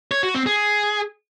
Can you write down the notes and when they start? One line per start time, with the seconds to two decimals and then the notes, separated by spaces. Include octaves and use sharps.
0.11 C#5
0.23 F#4
0.35 C4
0.46 G#4